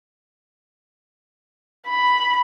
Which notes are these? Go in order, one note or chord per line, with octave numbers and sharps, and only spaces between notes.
B5